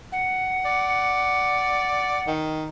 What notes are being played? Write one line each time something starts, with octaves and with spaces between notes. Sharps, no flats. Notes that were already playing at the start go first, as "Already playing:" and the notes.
F#5
D5
D#3